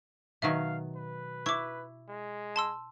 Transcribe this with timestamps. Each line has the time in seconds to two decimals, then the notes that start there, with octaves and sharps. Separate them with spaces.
0.42 B2 D#3 F#3 E5 F5
0.96 B4
1.46 E4 C#6 D6
2.09 G#3
2.56 A5 C6 E6